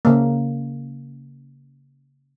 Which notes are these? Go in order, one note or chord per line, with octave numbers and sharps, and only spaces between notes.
C#3 A#3